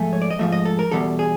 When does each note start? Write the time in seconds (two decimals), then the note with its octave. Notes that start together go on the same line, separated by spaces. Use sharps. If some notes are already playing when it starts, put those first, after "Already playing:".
Already playing: G#2 F3 A3 G#5
0.13 C#5
0.22 D5
0.30 D#5
0.39 G#2 F3 A3 E5
0.52 D#5
0.65 A4
0.79 A#4
0.91 E2 B2 G3 A4
1.19 G#4